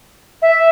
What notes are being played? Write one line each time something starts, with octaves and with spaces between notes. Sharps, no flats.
E5